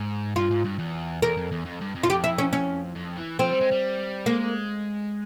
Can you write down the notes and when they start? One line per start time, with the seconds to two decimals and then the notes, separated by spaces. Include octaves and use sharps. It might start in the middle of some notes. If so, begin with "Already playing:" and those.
Already playing: G#2
0.36 G2 F4
0.51 G#2
0.65 G2
0.79 E2
1.22 E2 A#4
1.37 F2
1.52 E2
1.65 F2
1.81 G2
1.95 F2
2.03 F4
2.09 F2 G4
2.24 E4
2.38 C#4
2.53 C#4
2.96 F2
3.18 E3
3.39 F3 C4
3.51 G3
3.61 G#3
3.71 G3
4.26 G#3 A#3